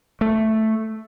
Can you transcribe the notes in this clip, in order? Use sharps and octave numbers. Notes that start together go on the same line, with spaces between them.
A3